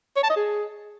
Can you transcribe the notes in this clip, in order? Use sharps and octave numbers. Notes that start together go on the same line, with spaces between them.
C#5
A5
D#5
G#4